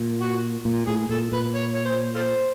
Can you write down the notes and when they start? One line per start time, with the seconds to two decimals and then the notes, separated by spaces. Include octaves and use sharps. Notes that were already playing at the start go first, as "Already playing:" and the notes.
Already playing: A#2
0.21 F#4
0.65 A#2
0.87 A2 G#4
1.09 A#2 A4
1.32 A#2 B4
1.55 C#5
1.75 C#5
1.85 C5
2.15 F4 A4 C5